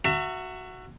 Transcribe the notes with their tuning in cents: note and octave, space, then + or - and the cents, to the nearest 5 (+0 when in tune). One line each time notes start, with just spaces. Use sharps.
F#4 +0 E5 +25 A#5 -40